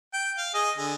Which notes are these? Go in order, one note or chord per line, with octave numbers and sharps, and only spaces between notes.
G5
F5
G#4 D#5
D3 G#4